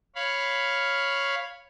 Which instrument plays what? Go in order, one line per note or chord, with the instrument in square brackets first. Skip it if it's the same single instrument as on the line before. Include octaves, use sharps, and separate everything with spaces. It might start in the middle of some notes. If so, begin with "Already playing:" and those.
[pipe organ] C#5 F5 B5